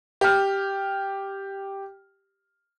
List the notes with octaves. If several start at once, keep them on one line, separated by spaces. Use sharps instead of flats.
G4 F6